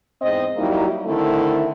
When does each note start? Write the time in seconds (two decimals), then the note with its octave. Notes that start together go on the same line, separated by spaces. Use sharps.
0.22 E2 G#2 C4 D#5
0.57 F#3 G3 A#3 D#4 E4
1.06 D3 D#3 A3 C4 E4